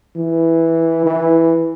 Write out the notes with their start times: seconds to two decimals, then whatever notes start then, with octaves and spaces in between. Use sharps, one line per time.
0.16 E3
1.06 E3